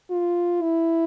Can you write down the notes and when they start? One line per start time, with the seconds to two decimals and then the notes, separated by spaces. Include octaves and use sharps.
0.10 F4
0.62 E4